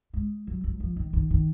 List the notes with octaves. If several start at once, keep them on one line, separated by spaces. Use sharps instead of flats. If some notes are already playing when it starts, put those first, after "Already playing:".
G#3
F#3
F#3
F3
D#3
D#3
D#3